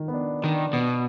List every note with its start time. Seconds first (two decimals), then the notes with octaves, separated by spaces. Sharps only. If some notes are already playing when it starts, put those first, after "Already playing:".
Already playing: D#3
0.08 B3
0.14 D4
0.43 D#3 D4
0.73 B2 B3